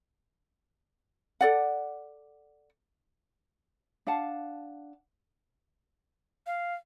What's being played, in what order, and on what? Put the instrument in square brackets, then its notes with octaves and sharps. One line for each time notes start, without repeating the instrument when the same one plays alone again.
[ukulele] A4 D5 F#5
D4 F5 F#5 A5
[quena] F5